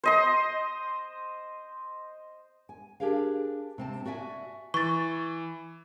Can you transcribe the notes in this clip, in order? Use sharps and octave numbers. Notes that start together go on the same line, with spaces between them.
C5 D#5 C6
G#5
D4 G4 G#4 A#4 F5
C3 C4 A5
F#4 D5 E5 G#5
E3 C#6 A6